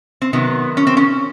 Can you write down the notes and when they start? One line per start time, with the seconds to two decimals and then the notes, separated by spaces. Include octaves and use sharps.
0.22 C4
0.33 C3 D#3 F#3 B3
0.77 C#4
0.87 C4
0.97 C#4